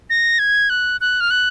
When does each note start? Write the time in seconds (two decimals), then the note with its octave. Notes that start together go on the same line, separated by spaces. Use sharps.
0.10 A#6
0.39 G#6
0.70 F#6
1.01 F#6
1.21 F6
1.30 F#6